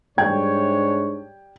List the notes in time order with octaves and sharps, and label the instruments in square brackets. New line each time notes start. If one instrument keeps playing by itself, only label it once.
[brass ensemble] G#2 D4 C#5 [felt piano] G3 G5 G#6